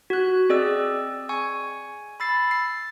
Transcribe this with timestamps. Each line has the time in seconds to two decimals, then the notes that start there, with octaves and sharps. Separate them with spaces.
0.10 F#4 F#6
0.49 C4 G#4 D5 D#5 E6
1.29 G#5 C#6
2.20 B5 E6 A6 C7
2.51 A6 C7